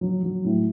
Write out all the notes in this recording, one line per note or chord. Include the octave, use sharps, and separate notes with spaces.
F#3
F#3
A2